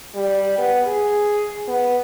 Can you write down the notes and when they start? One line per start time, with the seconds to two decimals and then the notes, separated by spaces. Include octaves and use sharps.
0.15 G3
0.58 B3
0.87 G#4
1.68 B3